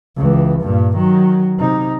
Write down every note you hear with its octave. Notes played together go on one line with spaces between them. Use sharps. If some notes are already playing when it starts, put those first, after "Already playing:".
C#2 E3
G2 A#2
D#3 F#3
C3 D#4